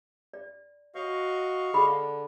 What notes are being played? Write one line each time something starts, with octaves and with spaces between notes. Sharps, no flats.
D5
F#4 C#5 D#5 F5 C#6
D3 G#4 B5